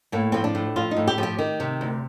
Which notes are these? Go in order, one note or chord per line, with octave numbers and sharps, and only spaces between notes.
A2 A#3
F3 C4
D4
A2
F3 F4
D#4
A2
G4
F3
G4
D#3
C3
D2